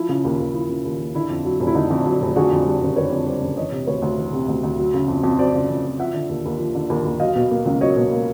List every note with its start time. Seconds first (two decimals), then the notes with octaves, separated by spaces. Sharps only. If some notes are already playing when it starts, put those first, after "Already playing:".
Already playing: F3 E4
0.09 C#3
0.25 D#2
0.39 D#2
0.54 F3 E4
0.69 C#3
0.85 D#2
1.00 D#2
1.15 D3 E4
1.30 F2
1.45 F#3
1.60 F1
1.67 E4
1.75 D3 D#4
1.91 F2
2.06 F#3
2.21 F1
2.36 D3 F#4 G#4
2.52 F2
2.66 G3
2.81 F#1
2.96 D3 B4 C#5
3.11 F2
3.26 G3 C5 D5
3.42 F#1
3.57 E3 C#5 D#5
3.72 C3
3.87 D2 B4 C#5
4.02 D2
4.18 E3
4.33 C3
4.48 D2
4.63 D2
4.79 F#3
4.94 C#3
5.08 F2
5.23 F2
5.39 F#3 C5 D5
5.54 C#3
5.69 F2
5.85 F2
5.99 F3 E5 F#5
6.14 D3
6.29 D#2
6.45 D#2
6.59 F3
6.75 D3
6.90 D#2
7.05 D#2
7.20 F#3 D#5 F5
7.35 B2
7.51 A#3
7.65 C#2
7.81 F#3 C#5 D#5
7.96 B2
8.12 A#3